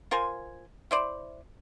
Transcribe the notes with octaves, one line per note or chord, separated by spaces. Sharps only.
F4 A#4 C5 G#5
E4 C5 D5